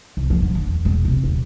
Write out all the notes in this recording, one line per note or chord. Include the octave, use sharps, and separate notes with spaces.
C2
F3
D3
D3
E2
E1
C3
D#1